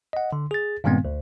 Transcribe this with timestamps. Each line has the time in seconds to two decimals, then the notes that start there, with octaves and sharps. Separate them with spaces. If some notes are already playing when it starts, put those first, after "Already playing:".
0.13 D#5 F#5
0.32 D3
0.51 G#4 A6
0.84 G2 A#2 D#3 G#3 B3 C4
1.05 D2